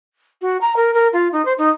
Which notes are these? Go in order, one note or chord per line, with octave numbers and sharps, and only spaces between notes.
F#4
A#5
A#4
A#4
F4
D#4
C5
D#4